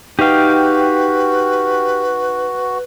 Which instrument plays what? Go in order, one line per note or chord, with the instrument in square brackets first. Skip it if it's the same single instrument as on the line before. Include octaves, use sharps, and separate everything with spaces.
[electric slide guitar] D#4 G5 [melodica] F#4 [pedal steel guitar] G4 F5 [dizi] B4